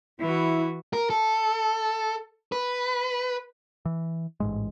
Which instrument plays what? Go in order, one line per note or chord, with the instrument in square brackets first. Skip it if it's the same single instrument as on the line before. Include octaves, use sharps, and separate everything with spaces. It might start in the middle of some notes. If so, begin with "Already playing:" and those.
[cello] E3 F#4 [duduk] E4
[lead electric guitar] A#4
A4
B4
[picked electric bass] E3
A1 G#2 G#3